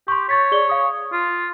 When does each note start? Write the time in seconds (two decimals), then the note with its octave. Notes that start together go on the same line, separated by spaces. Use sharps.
0.08 G4 C6 C#6
0.29 C#5 C#6 A6 B6
0.52 G#4 D5 G7
0.69 F5 D#6
1.13 F4